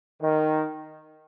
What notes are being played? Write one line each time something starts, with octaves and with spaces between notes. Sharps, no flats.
D#3